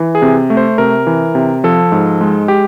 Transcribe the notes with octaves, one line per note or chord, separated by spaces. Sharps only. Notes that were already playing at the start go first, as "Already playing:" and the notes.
Already playing: E3
G#4
C3
A3
C5
C3 A#4
E3
C3
F3 A4
G#2
G#3
G4